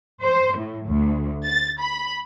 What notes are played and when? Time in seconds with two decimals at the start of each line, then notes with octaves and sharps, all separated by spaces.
0.23 C5
0.57 A2
0.88 D2
1.46 A6
1.80 B5